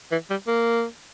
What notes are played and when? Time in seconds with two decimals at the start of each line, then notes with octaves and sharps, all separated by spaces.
0.12 E3
0.30 G3
0.47 A#3